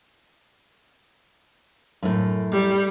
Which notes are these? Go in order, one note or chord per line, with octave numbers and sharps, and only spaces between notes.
F#2 A2
G3